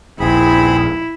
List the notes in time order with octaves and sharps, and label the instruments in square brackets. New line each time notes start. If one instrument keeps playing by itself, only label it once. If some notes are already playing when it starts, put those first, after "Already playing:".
[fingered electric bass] D#1 A#1 [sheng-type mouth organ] C4 G#4 B5 [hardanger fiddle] E4